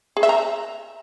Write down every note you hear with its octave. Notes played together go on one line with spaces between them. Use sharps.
G#4
E5
A#5